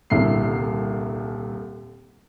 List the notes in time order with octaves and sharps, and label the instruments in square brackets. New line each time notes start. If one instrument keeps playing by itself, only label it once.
[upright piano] D#1 C2 D3 E4 C7